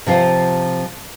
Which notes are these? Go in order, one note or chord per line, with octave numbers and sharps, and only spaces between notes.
C3 F3 F4 C5